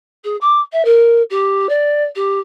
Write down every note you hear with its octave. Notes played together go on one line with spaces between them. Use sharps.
G#4
D6
E5
A#4
G4
D5
G4